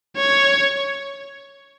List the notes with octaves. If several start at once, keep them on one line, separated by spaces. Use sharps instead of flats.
C#5